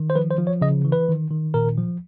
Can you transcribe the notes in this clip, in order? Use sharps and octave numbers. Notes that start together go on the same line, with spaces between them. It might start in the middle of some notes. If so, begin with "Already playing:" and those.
Already playing: D#3
C5
F3 B4
C5
F3
C#5
C#3 D#5
E3
B4
D#3
D#3
A#2 A#4
F3